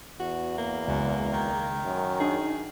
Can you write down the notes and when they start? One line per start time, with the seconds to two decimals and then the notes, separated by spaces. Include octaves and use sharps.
0.20 E2 F#4
0.58 A#3
0.87 C#2 F#2 C#3 G#3
1.33 D#3
1.85 F#2
2.20 D4 D#4 G#4